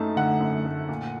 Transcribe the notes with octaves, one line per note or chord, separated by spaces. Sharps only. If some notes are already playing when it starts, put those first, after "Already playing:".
Already playing: F#2 A3 D#4 A5
D3 F#5
F#2
A3
A#2